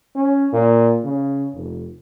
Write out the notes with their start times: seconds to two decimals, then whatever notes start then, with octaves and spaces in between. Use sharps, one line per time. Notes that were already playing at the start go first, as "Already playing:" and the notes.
0.15 C#4
0.53 A#2
1.04 C#3
1.55 F1